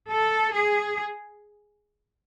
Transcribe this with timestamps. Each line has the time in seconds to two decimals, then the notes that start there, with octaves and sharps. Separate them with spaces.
0.11 A4
0.55 G#4